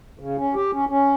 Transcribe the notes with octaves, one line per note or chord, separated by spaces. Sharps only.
C#3
C#4
G4
C#4
C#4